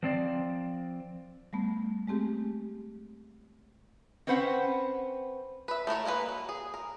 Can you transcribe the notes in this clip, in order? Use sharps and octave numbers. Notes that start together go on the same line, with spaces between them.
F3 C4 D5
G3 A3 B3
G#3 A3 C4 G4 G#4
C4 C#4 B4 C5 F#5
B4 E5
A3 E4 A#4 C#5
G#3 A#3 G#4 B4
F#3
G#4
A#4